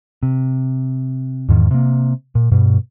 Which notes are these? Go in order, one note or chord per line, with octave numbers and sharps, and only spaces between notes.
C3
E2 G#2 D#3
C3 A#3
A#2
G2 B2